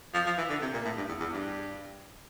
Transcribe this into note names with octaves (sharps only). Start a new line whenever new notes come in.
F3
F3
E3
D3
C3
A#2
A2
G2
E2
E2
G2